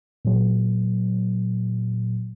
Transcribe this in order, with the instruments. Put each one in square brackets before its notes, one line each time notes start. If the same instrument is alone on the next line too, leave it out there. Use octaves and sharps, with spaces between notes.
[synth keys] A#2 F#3